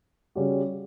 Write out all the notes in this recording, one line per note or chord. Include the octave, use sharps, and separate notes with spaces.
C#3 G3 C#4 F#4